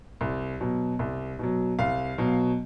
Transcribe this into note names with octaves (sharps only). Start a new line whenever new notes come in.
C2
B2 F#3
C2
B2 F#3
C2 F5
B2 F#3